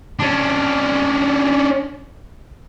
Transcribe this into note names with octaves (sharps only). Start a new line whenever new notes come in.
C#4 D4